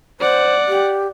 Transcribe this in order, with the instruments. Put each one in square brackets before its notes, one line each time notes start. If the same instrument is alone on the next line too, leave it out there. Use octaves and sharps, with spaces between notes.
[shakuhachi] C5 [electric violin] D5 F#5
[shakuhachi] G4